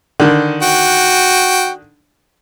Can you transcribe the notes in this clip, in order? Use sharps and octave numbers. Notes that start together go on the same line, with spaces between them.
D3 D#3
F#4 G5